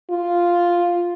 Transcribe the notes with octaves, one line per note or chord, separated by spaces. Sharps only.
F4